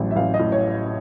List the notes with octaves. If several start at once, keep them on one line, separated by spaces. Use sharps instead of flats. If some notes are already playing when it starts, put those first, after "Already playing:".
Already playing: A1 A2 F#3
E5
A1 F5
D#5
A2
C#5